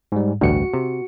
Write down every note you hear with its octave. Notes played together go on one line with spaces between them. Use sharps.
G#2 G3
A1 D2 G2 F#4 C#7
C3